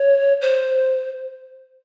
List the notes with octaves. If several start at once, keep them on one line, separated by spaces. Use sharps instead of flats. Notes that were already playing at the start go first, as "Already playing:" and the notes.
Already playing: C#5
C5